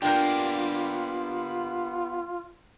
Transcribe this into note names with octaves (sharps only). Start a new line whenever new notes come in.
A#3 B3 D4 F4 G4 G5 G6